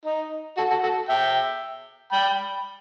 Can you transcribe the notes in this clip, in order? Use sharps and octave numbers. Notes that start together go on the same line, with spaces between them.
D#4
F#4 A4
F#4 A4
F#4 A4
E5 G5
G5 B5